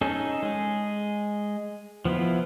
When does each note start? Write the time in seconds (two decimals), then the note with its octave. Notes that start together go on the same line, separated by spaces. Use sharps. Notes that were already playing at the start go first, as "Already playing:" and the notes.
0.01 C#4 D#4 G#4 A4
0.43 G#3 G#4
2.05 F3 B3 E4 F4